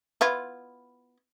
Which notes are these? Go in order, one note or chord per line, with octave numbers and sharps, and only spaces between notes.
B3 E4 F4